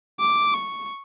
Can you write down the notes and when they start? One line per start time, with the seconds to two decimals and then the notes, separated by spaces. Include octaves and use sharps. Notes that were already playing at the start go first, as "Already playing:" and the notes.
0.20 D6
0.54 C#6